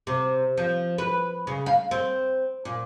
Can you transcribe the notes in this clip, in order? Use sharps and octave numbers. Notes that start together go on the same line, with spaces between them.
C3
F3
B4
C#3
F5
C4
A#2